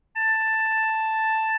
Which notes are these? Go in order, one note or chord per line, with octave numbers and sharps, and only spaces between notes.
A5